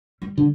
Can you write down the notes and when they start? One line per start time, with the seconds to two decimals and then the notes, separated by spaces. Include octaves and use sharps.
0.22 G3
0.38 D3